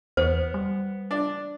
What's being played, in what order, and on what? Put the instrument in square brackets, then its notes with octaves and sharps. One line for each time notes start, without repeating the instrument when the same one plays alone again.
[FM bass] E2 [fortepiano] B3 [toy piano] C5
[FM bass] G3
[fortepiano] D4